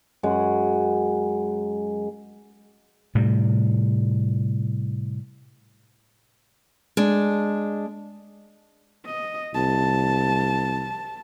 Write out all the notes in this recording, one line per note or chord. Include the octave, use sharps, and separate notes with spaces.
F#2 G#3 F#5
A2 C3 G3
G#3 D4
D#5
C2 A5